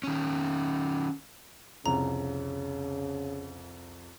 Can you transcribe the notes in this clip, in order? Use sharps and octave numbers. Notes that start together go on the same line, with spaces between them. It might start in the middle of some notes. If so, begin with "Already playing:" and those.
D#3 C#4
C2 F2 C#3 A#5